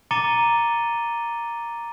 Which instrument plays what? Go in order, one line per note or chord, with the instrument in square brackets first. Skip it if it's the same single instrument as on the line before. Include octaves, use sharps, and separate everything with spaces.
[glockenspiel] A#5 D6 A6 C#7 D#7 G7